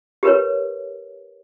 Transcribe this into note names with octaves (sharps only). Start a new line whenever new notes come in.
G4 A#4 B4 C#5